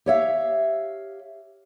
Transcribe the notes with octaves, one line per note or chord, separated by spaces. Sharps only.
G4 C#5 E5 F5